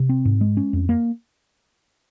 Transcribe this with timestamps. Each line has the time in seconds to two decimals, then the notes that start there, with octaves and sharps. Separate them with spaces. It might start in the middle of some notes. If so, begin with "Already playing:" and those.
Already playing: C3
0.09 C4
0.25 G#2
0.41 G#3
0.57 C#4
0.73 F2
0.89 A#3